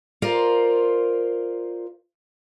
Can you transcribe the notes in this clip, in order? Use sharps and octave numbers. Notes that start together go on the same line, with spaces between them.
F4 A#4 C5 D5